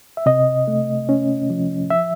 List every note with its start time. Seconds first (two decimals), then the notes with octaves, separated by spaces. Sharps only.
0.17 E5
0.26 C3 D#5
0.68 A3
1.09 C#4
1.50 F3
1.90 E5